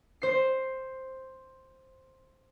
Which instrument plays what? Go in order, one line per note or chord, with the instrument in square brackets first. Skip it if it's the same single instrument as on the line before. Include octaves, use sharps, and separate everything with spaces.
[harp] C5 C7